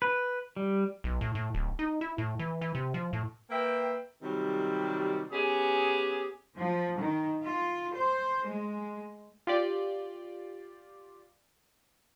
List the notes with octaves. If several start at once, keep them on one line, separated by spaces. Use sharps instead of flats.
B4
G3
B1
A2
A2
D1
D#4
E4
A2
E3
E3
C3
F3
A2
A#3 B4 E5 G5
C3 D#3 F#3 G3
B3 C#4 G4 G#4
F3
D#3
F4
C5
G#3
F4 G4 D5